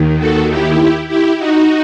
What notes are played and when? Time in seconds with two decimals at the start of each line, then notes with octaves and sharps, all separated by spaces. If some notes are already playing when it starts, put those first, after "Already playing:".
Already playing: D#2 D#3
0.19 F#4 A4
0.49 E4 G4
1.09 E4 G4
1.38 D#4 F#4